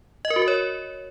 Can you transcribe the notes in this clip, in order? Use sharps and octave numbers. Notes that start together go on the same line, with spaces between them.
D#5
A#4
F#4
A#4
C#5